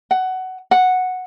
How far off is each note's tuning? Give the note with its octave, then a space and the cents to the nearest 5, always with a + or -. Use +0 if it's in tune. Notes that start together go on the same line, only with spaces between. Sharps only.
F#5 +15
F#5 -5